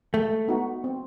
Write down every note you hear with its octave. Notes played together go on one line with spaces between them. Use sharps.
G#3 A3
B3 D#4 F#4
C4